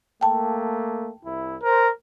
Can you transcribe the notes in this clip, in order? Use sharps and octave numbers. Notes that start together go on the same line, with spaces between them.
A3 A#3 G5 A5
C2 E4
A#4 C5